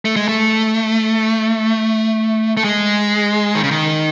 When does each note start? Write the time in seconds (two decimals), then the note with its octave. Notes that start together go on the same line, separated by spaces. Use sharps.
0.05 A3
0.16 G#3
0.28 A3
2.57 A3
2.64 G#3
3.55 D#3
3.63 C#3
3.71 D#3